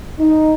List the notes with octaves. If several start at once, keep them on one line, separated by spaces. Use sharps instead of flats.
D#4